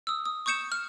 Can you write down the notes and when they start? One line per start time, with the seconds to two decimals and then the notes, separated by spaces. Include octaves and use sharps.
0.07 D#6 E6
0.26 D#6
0.46 C#6 D#6 G6 C#7 E7
0.72 F6